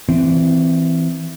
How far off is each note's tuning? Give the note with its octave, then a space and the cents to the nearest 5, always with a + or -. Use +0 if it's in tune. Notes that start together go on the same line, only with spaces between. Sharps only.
E3 +0 C4 -15